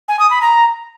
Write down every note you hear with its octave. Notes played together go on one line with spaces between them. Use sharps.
G#5
D#6
B5
A#5